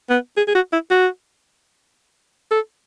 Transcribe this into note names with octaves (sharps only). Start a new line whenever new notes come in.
B3
G#4
G#4
F#4
E4
F#4
A4